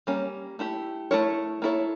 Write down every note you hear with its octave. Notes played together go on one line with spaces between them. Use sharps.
G3 A#3 C#4
A3 E4 G4
A3 E4 A#4 C#5
A#3 E4 A4 C#5